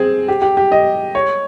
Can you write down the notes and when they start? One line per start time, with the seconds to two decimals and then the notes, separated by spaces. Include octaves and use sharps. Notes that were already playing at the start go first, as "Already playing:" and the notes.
Already playing: C4 G#4
0.28 G4
0.42 G4
0.57 G4
0.72 D#5
1.15 C#5